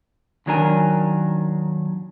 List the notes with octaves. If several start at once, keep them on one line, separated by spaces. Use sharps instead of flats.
D#2 D#3 F#3 D4 A#4 G#5